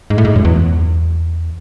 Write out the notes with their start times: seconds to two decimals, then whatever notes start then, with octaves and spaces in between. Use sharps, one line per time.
0.10 G#2
0.18 A2
0.25 G#2
0.36 F#2
0.45 E2